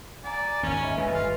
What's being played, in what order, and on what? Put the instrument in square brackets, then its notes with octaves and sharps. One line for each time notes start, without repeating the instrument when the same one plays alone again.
[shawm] D5 [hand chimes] F#5 A#5 [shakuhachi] G#5
[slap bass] G#1 D#2 [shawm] C#4
[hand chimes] D#5 E5 B5
[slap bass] C#2 F#2 A2 [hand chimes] B4
[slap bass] G1 [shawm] F4